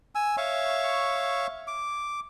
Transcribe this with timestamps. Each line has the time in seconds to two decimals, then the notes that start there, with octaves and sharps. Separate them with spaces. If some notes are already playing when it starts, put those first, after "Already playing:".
0.15 G#5 E6
0.37 C#5 E5 F5 C#6
1.67 D6